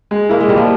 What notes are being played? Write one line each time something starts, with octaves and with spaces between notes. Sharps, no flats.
G#3
A#3 E4
G#3
A#2 G3
F3